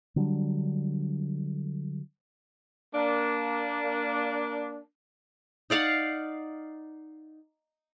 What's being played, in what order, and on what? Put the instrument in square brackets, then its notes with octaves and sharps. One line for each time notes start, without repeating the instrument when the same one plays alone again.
[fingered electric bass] D3 F#3 G3 D4
[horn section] A#3 D4
[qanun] D#4 D5 F5 F#5